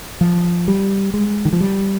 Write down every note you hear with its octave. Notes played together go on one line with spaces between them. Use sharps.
F3
G3
G#3
D#3
F3
G3